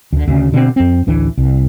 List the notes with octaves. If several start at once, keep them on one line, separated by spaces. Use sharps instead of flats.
D2 D3
D2 C#3
B2 D3 B3 C4
F2 C4
A1 D2 E3 D4
C2